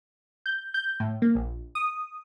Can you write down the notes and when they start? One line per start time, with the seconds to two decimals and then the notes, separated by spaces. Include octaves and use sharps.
0.46 G6
0.74 G6
1.00 A2
1.22 A#3
1.35 A#1
1.75 D#6